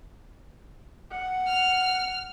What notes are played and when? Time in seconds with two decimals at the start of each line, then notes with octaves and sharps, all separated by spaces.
1.11 F#5
1.47 F6